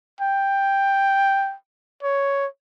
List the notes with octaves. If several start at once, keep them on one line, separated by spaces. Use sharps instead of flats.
G5
C#5